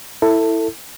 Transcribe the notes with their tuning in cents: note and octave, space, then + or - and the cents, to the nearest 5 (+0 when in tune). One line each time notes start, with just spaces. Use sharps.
E4 +0 A4 +20